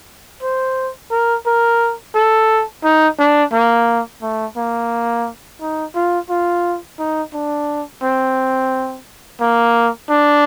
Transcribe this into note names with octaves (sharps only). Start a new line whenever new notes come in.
C5
A#4
A#4
A4
D#4
D4
A#3
A3
A#3
D#4
F4
F4
D#4
D4
C4
A#3
D4